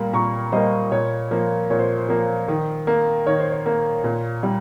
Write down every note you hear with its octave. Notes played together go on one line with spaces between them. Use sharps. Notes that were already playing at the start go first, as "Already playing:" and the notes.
Already playing: A#2 G3 A#3 C6
A#2 A#5 C#6
G3 A#3 C5 D#5
A#2 C#5
F3 A#3
A#2 C#5
C5
C5
F3 A#3
D#3
A#3
D#3 C#5
C5
C#5
A#3
A#2
G3